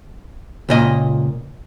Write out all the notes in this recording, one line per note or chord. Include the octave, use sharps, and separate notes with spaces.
C#2 A#2 D#5